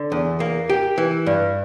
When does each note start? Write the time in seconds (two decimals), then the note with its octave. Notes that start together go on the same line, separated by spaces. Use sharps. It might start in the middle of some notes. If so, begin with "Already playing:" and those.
Already playing: D3
0.12 E2
0.40 A#3
0.70 G4
0.98 E3
1.26 G2